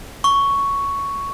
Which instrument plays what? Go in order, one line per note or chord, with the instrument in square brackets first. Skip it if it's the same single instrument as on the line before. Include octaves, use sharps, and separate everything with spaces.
[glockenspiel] C#6